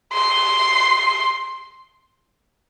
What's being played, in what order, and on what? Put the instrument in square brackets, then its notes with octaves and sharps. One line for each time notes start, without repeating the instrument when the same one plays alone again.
[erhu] C6